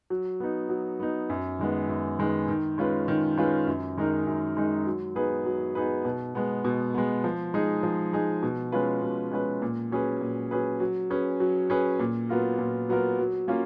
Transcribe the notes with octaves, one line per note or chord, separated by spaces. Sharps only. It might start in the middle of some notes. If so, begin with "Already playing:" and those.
F#3
B3 D#4
F#3
B3 D#4
F#2
D#3 G#3 B3
F#2
D#3 G#3 B3
D#3
G#3 C#4 F4 B4
D#3
G#3 C#4 F4 B4
F#2
D#3 G#3 D#4 A#4
F#2
D#3 G#3 D#4 A#4
F#3
B3 D#4 G#4 B4
F#3
B3 D#4 G#4 B4
B2
G#3 B3
B2
G#3 B3
F3
G#3 D#4 G#4
F3
G#3 D#4 G#4
B2
G#3 C#4 F4 B4
B2
G#3 C#4 F4 B4
A#2
F#3 C#4 G#4 B4
A#2
F#3 C#4 G#4 B4
F#3
C#4 G#4 B4
F#3
C#4 G#4 B4
A#2
F#3 B3 F4 A#4
A#2
F#3 B3 F4 A#4
F#3
A#3 C#4 F4